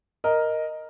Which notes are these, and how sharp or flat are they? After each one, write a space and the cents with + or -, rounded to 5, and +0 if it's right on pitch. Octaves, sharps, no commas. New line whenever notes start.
A#4 +0 D#5 +0